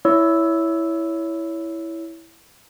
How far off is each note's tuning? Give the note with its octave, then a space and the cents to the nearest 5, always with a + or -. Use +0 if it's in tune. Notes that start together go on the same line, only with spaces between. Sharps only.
E4 +0 C#5 +20 E6 +0